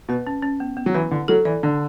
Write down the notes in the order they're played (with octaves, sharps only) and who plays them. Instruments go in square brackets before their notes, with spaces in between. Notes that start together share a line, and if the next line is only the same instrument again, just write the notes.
[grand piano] B2 [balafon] B4
[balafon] C#4
C#4
B3
B3
[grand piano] F#3
[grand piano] E3 [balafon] B4
[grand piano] D3 [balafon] E4
[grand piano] F#3 [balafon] A4
[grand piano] E3 [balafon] D5
[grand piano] D3 [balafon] D4